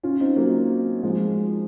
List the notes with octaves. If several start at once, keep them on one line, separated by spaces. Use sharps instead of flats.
C#4 F4
C4 D#4
F#3 A#3
F3 G#3